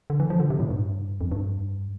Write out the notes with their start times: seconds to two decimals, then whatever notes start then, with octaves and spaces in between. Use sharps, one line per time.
0.10 D3
0.20 E3
0.30 F3
0.40 D3
0.50 C3
0.60 A2
0.70 G2
1.21 F2
1.32 G2